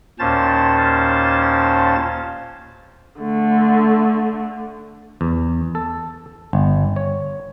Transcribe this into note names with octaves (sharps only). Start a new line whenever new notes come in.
D#2 A#2 C#4 C5 A5 A6
D3 A3
E2
A4
G1
C#5